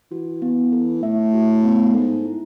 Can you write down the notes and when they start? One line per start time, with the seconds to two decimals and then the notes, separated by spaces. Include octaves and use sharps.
0.12 E3 F#4
0.42 B3
0.73 A4
1.03 A2 E5
1.34 F#4
1.64 B3
1.94 G#2 A4
2.25 E4